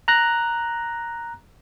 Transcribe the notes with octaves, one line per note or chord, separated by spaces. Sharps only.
A#5 F#6 A#6